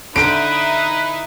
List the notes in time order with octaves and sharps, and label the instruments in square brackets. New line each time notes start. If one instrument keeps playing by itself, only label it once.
[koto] D3 G5 [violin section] D#4 E4 [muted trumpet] B4 [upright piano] D7